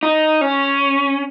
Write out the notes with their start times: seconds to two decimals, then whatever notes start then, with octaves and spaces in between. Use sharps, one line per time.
0.03 D#4
0.41 C#4